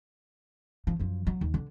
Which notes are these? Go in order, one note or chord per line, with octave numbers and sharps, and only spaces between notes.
F3
F#2 F3
F#3
D#2
D3